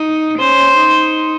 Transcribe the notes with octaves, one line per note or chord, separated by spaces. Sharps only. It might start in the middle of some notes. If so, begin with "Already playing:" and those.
Already playing: D#4
C#4 C5
D#4